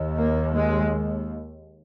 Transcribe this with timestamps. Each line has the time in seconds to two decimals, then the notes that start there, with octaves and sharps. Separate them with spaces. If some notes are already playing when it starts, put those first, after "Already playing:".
Already playing: D#2
0.16 A#3
0.54 G#3